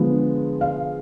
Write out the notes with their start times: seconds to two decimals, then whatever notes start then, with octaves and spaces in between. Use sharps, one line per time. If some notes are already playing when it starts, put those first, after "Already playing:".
Already playing: D3 F3 G#3 B3
0.61 F5